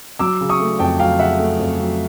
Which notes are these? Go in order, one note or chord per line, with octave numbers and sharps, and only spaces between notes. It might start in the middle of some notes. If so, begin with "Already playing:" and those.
F#3 D6 E6
C#3
C#6 D#6
A3
F2 G5 A5
F#3 F5 G5
C#3 E5 F#5
A3
F2
F#3